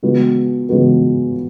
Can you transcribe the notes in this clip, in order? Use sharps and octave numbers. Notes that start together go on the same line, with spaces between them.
C#3 G#3 B3 F#4 B4
C#3 G#3 B3 F#4 B4